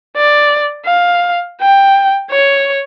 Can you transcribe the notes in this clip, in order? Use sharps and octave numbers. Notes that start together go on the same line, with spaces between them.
D5
F5
G5
C#5